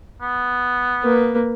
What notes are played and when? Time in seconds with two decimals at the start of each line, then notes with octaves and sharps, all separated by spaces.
0.21 B3
1.03 A#3 B4